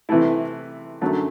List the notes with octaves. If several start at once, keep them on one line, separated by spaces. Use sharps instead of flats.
C3 E3 A3 E4
F#2 D3 F#3 A3